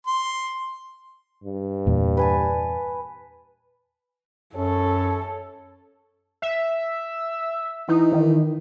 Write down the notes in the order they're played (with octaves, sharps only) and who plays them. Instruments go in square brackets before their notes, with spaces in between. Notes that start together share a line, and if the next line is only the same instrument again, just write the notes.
[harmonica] C6
[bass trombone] G2
[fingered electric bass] E2 A#2
[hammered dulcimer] B4 G#5 A5
[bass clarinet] F#2 [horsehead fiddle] A4 [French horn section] C#5
[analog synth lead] E5
[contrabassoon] E3 [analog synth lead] D#4
[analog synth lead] D#3